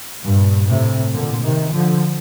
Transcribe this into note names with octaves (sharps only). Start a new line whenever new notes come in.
G2 A#2
A2 C3
A#2 D3
C3 D#3
D3 F3